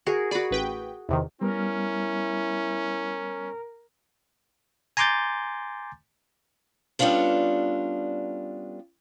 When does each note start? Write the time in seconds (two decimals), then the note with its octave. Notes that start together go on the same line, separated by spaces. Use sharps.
0.06 F#4 G#4 A#4
0.31 F#4 G#4 D5 B5
0.51 A1 B4 G5
1.09 E2 C3 D#3
1.41 G3 B3 C#4 E4 A#4
4.97 G#5 A#5 C6 D6 G6 A6
6.99 G3 B3 C#4 D4 F4 A4